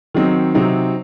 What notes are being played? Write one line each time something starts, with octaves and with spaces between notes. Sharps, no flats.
D#3 F#3 C4 D#4
C3 F#3 C4 D#4